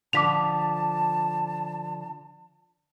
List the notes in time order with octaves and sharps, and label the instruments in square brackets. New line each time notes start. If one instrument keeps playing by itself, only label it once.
[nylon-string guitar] D3 F3 [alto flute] A5 [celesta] D6 B6 F7